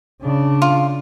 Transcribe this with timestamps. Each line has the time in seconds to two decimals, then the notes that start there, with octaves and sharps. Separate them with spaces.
0.22 C#3 D4
0.62 F4